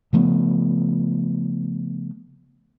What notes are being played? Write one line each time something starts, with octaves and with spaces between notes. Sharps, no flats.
C#3 F3 A3 B3